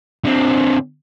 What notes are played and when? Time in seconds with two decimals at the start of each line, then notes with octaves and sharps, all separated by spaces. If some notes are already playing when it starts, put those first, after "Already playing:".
0.25 D3 C4